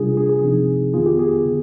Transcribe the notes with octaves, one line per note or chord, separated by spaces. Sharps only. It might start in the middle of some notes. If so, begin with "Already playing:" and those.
Already playing: C3 G3 D4 F4 G#4
G#4
G#4
C3 F3 C4 D#4
F2 D#3 B3 F4 G#4
G4
G#4
D3